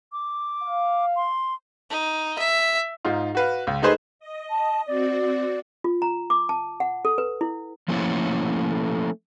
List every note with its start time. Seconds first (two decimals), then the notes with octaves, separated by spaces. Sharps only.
0.12 D6
0.62 F5
1.16 C6
1.90 D#4
2.38 E5
3.05 G#2 D#4 F4
3.35 F#4 B4 F5
3.67 C#2
3.82 A3 D#4 G#4 B4 C5 D#5
4.19 D#5
4.50 A5
4.87 C4 F#4 D5
5.84 F4
6.02 A#5
6.30 D6
6.49 A5
6.80 F#5
7.05 A4
7.18 B4
7.41 E4
7.88 F3 A3 A#3 C#4 E4 A4